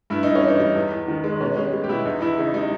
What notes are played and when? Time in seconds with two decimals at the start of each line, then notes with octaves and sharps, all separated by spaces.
0.10 G2 E4
0.23 G2 D#4
0.35 C#4
0.43 E3 D#4
0.60 G3
0.76 E2
0.91 E2
1.08 D#3
1.24 G#3
1.41 B2 C#4
1.56 G3 C#4
1.73 G3
1.84 G4
1.89 B2 E4
2.05 E2 D#4
2.22 E2 E4
2.38 C#3 D#4
2.54 G3 D#4